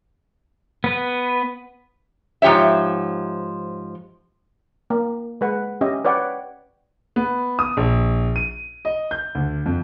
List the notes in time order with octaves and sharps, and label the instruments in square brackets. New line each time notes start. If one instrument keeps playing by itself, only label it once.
[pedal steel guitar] B3 B4
[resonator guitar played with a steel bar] G#2 F3 G4 C#5 E5
[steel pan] A#3
G#3 B4 F#5
C#4 G4 D#5 E5
B4 C#5 D5 F#5 G5
[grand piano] B3
D#6
A#1
D#7
D#5
G6
D2
F2